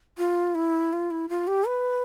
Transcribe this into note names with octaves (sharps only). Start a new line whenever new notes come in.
F4
E4
F4
E4
F4
G4
B4